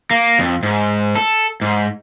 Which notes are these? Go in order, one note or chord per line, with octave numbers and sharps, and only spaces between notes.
A#3
F2
G#2
A4
G#2